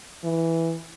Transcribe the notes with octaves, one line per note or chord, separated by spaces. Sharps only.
E3